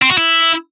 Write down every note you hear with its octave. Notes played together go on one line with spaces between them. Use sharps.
C4
F#4
E4